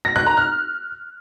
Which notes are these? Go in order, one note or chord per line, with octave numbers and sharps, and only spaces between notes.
A#6
F#6
A#5
F6